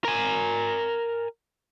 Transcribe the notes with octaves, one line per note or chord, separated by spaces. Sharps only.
A#4 G#5